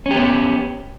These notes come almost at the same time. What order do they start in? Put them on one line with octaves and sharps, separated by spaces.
C#4 G4 B3